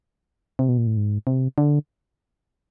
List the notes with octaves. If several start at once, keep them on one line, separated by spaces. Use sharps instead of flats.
C3
B2
A#2
A2
G#2
C3
D3